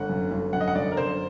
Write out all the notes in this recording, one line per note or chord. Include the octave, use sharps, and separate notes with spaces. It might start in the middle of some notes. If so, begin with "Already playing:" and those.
Already playing: G1 F#5
F#2
G1
F#2 F#5
D#5
F#5
G1 D5
A#4
F#2 C5